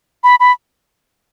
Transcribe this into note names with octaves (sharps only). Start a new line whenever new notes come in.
B5
B5